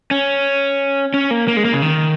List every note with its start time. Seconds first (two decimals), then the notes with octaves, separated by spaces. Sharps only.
0.11 C#4
1.14 C#4
1.31 A#3
1.48 A#3
1.57 G#3
1.65 A#3
1.73 C#3
1.82 D#3